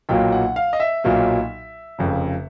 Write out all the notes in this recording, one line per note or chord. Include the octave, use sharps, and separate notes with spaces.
B1 A#2 F#3 A#3 G5
F#5
F5
D#5
E5
B1 A#2 F#3 A#3
F1 F2 C#3